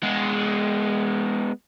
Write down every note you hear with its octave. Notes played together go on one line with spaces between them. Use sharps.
G#3 B3